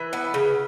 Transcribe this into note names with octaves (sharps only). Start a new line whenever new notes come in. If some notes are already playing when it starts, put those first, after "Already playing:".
Already playing: E3 B4
B3
C#3